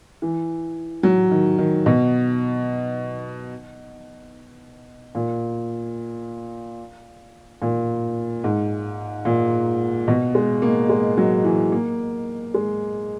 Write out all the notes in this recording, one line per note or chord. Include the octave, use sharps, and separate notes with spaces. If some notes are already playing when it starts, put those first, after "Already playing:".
E3
F#3
D#3
D#3
B2
A#2
A#2
G#2
A#2
B2
G#3
A#3
G#3
F#3
E3
A#3
G#3